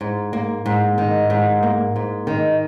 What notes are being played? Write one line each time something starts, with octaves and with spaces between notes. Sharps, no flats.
G#2
A#3
G#2
D#3
G#2
A#3
G#2
D#3